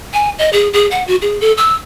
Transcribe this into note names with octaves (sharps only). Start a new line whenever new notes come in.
G#5
D#5
G#4
G#4
F#5
F#4
G#4
A4
E6